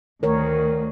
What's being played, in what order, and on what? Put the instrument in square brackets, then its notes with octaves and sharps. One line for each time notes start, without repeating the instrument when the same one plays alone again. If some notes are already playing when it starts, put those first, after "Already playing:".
[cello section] D2 [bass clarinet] D#3 [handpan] A#4 C#5